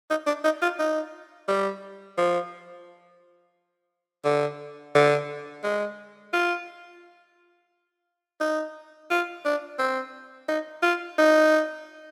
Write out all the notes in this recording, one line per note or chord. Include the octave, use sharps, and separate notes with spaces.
D#4
D4
D#4
F4
D#4
G3
F3
D3
D3
G#3
F4
D#4
F4
D4
C4
D#4
F4
D#4